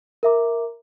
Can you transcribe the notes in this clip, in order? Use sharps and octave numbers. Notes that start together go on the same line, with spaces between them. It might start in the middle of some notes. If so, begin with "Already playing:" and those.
A#4 E5 A#5 D6